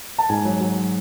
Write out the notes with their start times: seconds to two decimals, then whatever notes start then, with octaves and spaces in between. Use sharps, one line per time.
0.18 A5
0.29 G#2 G#5
0.45 F#3
0.61 F#3